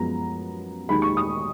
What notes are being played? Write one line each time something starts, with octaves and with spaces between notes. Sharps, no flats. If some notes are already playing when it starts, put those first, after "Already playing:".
Already playing: F#2 F3 G#3 B3 A#5
D#2 D#3 G#3 B5
C#6
D#6